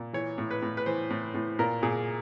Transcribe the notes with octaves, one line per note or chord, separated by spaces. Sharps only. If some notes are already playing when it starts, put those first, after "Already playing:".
Already playing: A#2
E3 C#5
A2
B4
A2
B4
E3 C5
A2
A2
A#2 A#4
A#2 G#4